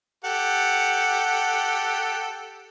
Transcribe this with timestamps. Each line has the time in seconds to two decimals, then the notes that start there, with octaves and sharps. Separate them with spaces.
0.25 G4 A4 F#5